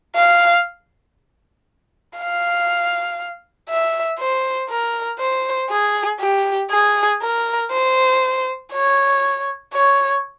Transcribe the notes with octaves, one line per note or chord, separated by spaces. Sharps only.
F5
F5
E5
C5
A#4
C5
G#4
G4
G#4
A#4
C5
C#5
C#5